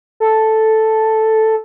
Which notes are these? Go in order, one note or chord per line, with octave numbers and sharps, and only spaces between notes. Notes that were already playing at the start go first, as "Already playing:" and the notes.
A4